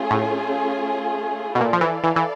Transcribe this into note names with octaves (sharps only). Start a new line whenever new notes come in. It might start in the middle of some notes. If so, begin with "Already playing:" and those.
Already playing: A3 C#4 F4 G#4
A2
B2
A#2 E4 A4 D5 F5
F3
E3
E3
E3